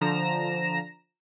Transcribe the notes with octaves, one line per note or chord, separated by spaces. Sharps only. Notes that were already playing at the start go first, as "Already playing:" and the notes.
D3 F3 A#5 A#6 E7